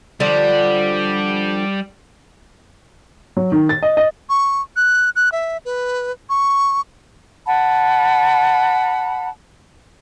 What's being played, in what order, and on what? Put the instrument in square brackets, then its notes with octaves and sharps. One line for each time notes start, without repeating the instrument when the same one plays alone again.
[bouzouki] D3 F3 D4 [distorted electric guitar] G3
[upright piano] F#3
D#3
A6
D#5
D#5
[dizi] C#6
F#6
F#6
E5
B4
C#6
[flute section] F#5 A5 B5